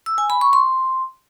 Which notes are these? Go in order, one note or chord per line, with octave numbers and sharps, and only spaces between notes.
E6
G#5
B5
C#6
C6